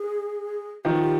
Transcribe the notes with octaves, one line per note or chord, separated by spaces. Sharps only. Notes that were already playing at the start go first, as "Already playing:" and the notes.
Already playing: G#4
D#3 F3 G4
F#4
G4